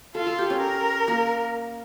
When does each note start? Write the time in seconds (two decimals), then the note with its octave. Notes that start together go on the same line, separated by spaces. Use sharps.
0.15 F4 A4
0.27 A4
0.39 G4
0.50 C#4
0.61 A#4
1.08 A#3